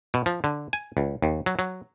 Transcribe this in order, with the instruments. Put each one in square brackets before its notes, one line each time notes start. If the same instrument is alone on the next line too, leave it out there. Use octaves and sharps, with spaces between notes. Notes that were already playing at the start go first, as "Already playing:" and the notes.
[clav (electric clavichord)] B2
F3
D3
G#5
C#2
D#2
F#3
F#3